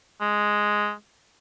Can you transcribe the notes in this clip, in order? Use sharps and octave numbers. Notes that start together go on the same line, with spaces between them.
G#3